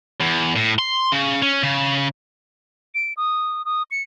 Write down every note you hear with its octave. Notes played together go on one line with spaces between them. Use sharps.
E2
A2
C6
C#3
C#4
C#3
D7
D#6
D#6
C#7